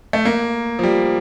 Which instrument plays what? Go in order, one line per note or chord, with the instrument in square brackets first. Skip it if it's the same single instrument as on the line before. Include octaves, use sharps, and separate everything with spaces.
[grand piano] A3
A#3
F3
G3